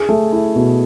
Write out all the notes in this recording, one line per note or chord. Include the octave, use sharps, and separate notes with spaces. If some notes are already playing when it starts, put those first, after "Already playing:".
Already playing: G#4
A3
E4
B2